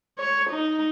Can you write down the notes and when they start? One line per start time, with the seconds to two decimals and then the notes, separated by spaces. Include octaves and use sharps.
0.18 C#5
0.50 D#4